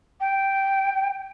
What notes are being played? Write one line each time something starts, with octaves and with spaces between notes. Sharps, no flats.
G5